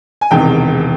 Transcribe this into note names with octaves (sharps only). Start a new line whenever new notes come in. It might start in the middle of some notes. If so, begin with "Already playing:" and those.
G#5
E1 E2 C3 D#3 G5